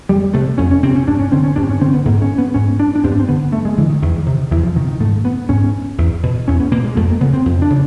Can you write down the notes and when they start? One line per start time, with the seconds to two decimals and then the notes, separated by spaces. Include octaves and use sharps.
0.09 F2 G3
0.34 C3 A3
0.58 F2 C#4
0.71 C#4
0.83 C3 C4
0.95 C#4
1.07 G2 D4
1.19 C#4
1.32 D3 C4
1.44 C#4
1.56 G2 D4
1.63 C4
1.69 C#4
1.81 D3 C4
1.93 B3
2.05 G#2 A#3
2.22 C#4
2.38 B3
2.54 G#2 C#4
2.80 D4
2.95 D4
3.04 G2 C4
3.12 B3
3.20 C4
3.28 D3 B3
3.52 G2 A3
3.65 G#3
3.78 D3 E3
3.90 D#3
4.02 E2 D#3
4.26 C3 D#3
4.51 E2 E3
4.63 F3
4.76 C3 D#3
4.88 D#3
5.00 G#2 A3
5.25 B3
5.49 G#2 C#4
5.98 E2
6.23 B2
6.48 E2 C#4
6.60 B3
6.71 B2 A#3
6.84 G#3
6.96 F2 A3
7.09 A#3
7.21 C#3 B3
7.33 C4
7.46 F2
7.62 D4
7.70 C#3